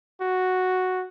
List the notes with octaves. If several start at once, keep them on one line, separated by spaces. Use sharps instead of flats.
F#4